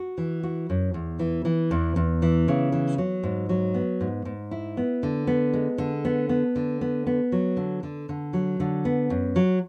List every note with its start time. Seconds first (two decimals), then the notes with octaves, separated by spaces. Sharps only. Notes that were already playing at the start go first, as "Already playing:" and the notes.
Already playing: F#4
0.18 E3
0.43 F#4
0.70 F#2
0.94 E2
1.19 E3
1.45 E3
1.71 E2
1.96 E2
2.22 E3
2.48 C#3
2.72 E3
2.98 F#3
3.23 G#2
3.49 F#3
3.74 B3
4.01 G#2
4.25 G#2
4.51 E4
4.77 B3
5.03 D3
5.27 B3
5.54 G#3
5.78 D3
6.05 B3
6.29 B3
6.56 D3
6.81 B3
7.07 B3
7.32 F#3
7.57 D3
7.83 D3
8.09 D3
8.33 F#3
8.60 D3
8.85 B3
9.10 F#2
9.36 F#3